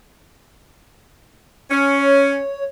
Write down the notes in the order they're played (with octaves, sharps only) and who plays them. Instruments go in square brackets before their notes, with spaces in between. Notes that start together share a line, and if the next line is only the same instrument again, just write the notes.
[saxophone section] C#4 [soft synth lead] C#5